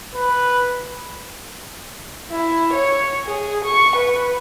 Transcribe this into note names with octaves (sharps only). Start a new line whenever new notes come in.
B4
E4
C#5
G#4
C#6
B4